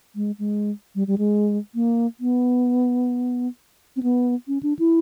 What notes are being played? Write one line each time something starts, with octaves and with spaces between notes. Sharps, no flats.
G#3
G#3
G3
G3
G#3
A#3
B3
C4
B3
C#4
D4
E4